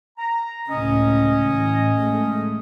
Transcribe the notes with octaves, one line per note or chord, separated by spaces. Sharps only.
A#5
C#2 A2 C#4 D#5
A1
G#3 A3